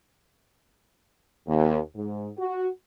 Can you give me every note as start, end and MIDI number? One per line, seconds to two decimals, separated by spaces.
1.47 1.79 39
1.95 2.28 44
2.38 2.68 66